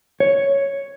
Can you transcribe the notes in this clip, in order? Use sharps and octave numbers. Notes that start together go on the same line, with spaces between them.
C#5